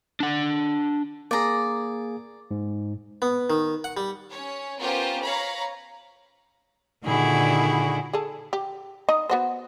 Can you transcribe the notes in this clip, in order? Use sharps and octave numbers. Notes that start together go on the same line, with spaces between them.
D4 F#5
A#3 G#4 D5 A#5
G#2
B3
D#3
F#5
G3
C#4 C#5
B3 C#4 F4 G4 A#4 C5
C#5 F5 A#5 B5
A#2 D3 D#3 E4 F#4 G#4
G#4 A4
G4
D#4 D#5
B3 F#4 C5